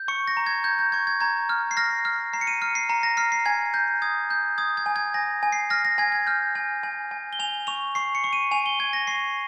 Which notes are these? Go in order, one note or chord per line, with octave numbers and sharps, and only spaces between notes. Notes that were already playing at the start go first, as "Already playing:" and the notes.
Already playing: G6
C#6 C#7
A#6
A#5
G#6
G6 G#6
G6
C#6 G#6
G#6
A#5 G#6
F6
C7
F6 A#6
F6
A#5 C7
C#7
D#7
F6 C#7
C7
A#5
A#6
F6 C7
C7
G#5 G#6
G6
D#6 G#6
G6
D#6 G#6
G#6
G#5
G#6
G#5 A#6
G#5
C7
F6 A#6
A#6
G#5 G#6
G#6
F6 G6
G#5
G#5
G#5
G7
G#5 F7
C#6 F7
C#6 C7
C#7
C#6
D#7
G#5 F7
G7
G#5 G#6
A#6
C#6 C7